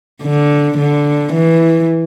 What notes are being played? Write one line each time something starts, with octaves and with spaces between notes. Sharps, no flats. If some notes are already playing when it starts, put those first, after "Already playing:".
D3
D3
E3